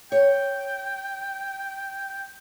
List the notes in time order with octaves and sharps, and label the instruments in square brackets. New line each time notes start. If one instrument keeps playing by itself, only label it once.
[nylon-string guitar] C#5 [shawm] G5